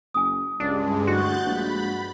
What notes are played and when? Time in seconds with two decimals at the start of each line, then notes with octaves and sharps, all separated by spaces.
0.14 F#1 G#5 D#6
0.60 C#2 G2 G#3 D4
1.07 D2 E4 F#4 C6 F#6 G6 A6
1.46 A#1 B5